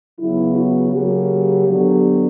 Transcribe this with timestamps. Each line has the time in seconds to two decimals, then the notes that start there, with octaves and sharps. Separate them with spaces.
0.18 C#3 F#3 B3 E4
0.55 F#4
0.92 C#3 F#3 A#3 G4
1.66 D3 F#3 B3